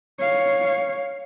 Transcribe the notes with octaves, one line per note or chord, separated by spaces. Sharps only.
C#5 F5